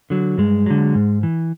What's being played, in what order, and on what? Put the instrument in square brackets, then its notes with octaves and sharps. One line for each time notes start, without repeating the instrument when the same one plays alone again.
[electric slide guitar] D3 F#3
G2 G#3
D3 F#3
G#2
E3